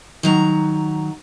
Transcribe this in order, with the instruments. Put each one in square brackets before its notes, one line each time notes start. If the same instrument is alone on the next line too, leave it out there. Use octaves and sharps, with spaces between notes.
[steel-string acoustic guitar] D#3 F#3 A#5